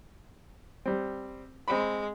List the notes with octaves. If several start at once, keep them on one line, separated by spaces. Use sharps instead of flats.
G3 C4
G#3 C4 B5